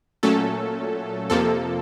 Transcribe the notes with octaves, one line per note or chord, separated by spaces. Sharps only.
A#2 F#3 A3 C#4 A4
F2 C3 F3 A#3 A4